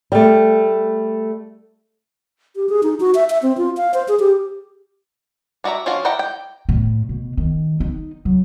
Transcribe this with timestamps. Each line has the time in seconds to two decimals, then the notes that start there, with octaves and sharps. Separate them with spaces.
0.12 G3 A3
2.56 G4
2.69 G#4
2.83 D#4
3.00 F#4
3.15 E5
3.30 E5
3.43 C4
3.57 F4
3.77 F5
3.94 C5
4.08 G#4
4.20 G4
5.64 D4 F#4 D5 E5 A#5
5.86 F3 C#4 D4 F4 F#4
6.05 E4 D5 F#5 G5 A#5
6.19 G5
6.69 A2
7.09 B2
7.37 D#3
7.80 D#4
8.25 F#3